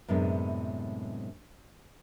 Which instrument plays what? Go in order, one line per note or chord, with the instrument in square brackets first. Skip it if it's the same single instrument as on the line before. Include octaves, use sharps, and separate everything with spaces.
[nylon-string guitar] F#2 A2 C3 G#3 B3 D4